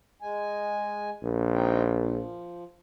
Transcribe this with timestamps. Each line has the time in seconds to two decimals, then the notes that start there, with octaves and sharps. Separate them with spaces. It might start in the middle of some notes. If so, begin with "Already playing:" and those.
0.22 G#3 G#5
1.24 A#1
1.55 C4 D#4 G5
1.97 F3